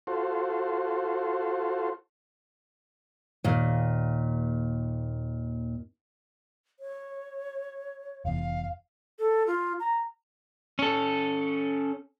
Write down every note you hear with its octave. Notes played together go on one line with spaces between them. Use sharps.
F4 F#4 A4 C5
D#2 A#2
C#5
F1 E2 F5
A4
F4
A#5
C#4 A4